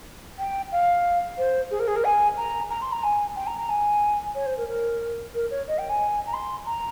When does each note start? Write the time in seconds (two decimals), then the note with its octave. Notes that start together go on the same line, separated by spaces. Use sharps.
0.38 G5
0.71 F5
1.38 C5
1.70 G#4
1.79 A#4
1.87 G#4
1.95 A#4
2.04 G#5
2.37 A#5
2.70 A#5
2.81 C6
2.92 A#5
3.03 G#5
3.35 G5
3.46 A#5
3.58 A#5
3.69 G#5
4.34 C#5
4.46 C5
4.57 A#4
4.68 A#4
5.34 A#4
5.50 C#5
5.67 D#5
5.78 G5
5.89 G#5
6.26 A#5
6.33 C6
6.66 A#5